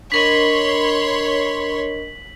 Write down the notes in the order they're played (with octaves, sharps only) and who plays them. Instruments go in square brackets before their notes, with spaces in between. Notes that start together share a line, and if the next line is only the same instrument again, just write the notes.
[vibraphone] D4 A#4 D#5 [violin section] C#5 B5 C6 [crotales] B6 F#7